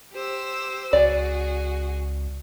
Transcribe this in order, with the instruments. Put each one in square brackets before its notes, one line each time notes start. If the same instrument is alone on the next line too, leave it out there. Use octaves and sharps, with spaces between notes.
[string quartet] G4 C5 E6
[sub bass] C#2 [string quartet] F#4 G#4 [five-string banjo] D5